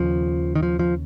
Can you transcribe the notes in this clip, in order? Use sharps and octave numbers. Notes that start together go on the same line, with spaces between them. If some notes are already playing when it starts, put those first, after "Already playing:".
Already playing: D#2 C#3 F3
D#3
F3
F3